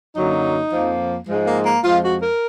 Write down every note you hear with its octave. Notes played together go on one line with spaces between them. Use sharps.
F#2 D3 F#3 A#3 D#4
F2 F3 A#3
G#2 F3 G#3
A#3
A#3
F2 F3 G#3 F4
F#4
A#4